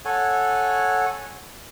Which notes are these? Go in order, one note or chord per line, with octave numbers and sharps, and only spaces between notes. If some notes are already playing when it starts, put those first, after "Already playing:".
A4 C#5 F#5 G#5